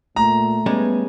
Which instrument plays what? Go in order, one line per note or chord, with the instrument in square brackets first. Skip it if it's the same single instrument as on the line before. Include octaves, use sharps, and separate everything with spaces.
[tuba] A#2 [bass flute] A3 [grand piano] A#5
[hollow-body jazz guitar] G3 G#3 C#4 [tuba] B3